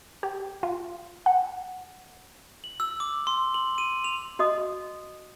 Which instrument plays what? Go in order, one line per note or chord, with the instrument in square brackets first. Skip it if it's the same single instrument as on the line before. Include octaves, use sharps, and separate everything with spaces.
[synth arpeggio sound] G4
F4
F#5
[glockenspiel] F#7
E6
D6
C6
F#7
D#7
F7
[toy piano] F#4 D#5 D#6